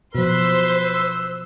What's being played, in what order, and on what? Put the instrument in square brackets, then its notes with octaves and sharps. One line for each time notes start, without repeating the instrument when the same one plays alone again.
[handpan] B2 F3 [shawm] B4 [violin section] C5 C6 [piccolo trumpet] E6